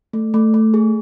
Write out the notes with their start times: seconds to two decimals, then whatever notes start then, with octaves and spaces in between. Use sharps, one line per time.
0.13 A3
0.34 A3
0.54 A3
0.74 G#4